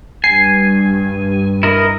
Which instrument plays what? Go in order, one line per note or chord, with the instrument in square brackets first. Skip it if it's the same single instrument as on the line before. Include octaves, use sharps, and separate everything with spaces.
[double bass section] G2 [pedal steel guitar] G#5 [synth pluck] C7
[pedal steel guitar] E4 A#4 D#5